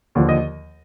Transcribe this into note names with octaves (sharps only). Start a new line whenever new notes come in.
D#2 D3 F3
D#5